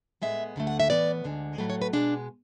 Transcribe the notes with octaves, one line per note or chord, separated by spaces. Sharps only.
A2 G#3 B3 E5
D2 D3 A3
F#5
E5
A2 E3 B3 D5
D2 D3 G#3
A2 F#3 A3 B4
C#5
B4
B2 G#3 B3 D4